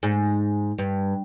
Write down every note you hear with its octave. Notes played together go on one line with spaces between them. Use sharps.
G#2
G2